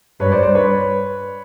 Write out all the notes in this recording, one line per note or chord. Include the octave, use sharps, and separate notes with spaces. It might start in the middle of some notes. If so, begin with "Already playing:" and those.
G2 B4 C#5
C5 D5
C5 D5
B4 C#5